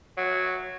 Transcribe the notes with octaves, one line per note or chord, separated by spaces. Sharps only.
F#3